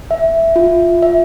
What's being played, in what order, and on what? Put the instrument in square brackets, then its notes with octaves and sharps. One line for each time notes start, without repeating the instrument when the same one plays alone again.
[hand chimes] E5
F4
E5